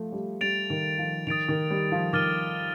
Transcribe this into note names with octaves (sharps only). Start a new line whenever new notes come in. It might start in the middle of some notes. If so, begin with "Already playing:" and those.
Already playing: F3 A3
G3
G3 A6 D7 F7
D#3
F3
D#3 D#6 A6 D7 F7
D#3
G3
F3
D#3 D6 F6 A6 D#7 G7